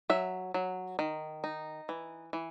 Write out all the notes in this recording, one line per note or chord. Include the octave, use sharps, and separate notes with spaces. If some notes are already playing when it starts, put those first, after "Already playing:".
F#3 E5
F#3
D#3
D#4
E3
E3